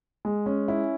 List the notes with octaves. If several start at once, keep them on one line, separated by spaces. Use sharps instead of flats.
G#3
C#4
E4